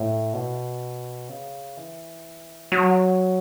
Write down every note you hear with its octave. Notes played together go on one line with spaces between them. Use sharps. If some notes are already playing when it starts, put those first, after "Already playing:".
Already playing: A2
B2
C#3
E3
F#3